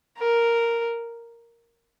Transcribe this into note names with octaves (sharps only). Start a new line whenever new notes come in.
A#4